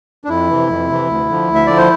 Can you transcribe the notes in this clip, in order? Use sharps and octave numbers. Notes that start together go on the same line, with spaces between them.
D4
F2 E4
C3 E3
F2
C3 E3
D2
D3 F3
D2
E5
D3 F3 D5
C5